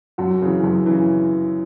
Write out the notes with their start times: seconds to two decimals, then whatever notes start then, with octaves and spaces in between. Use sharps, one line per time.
0.18 F#2 F#4
0.42 C#3 E3
0.64 F#2
0.86 C#3 E3